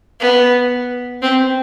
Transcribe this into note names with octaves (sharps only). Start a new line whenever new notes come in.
B3
C4